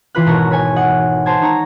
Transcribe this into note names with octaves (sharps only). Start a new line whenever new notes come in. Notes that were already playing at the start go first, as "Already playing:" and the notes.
E3 F4 B4 F#6
G#1 B2 E4 A#4 C#5 A#5
B4 C#5 G#5
D#5 F#5
C5 A5 G#6
D#4 C#5 A#5